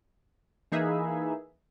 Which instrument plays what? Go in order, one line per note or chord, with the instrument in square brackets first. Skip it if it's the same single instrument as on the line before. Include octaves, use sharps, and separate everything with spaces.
[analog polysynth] E3 A#3 D#4 G#4 B4 E5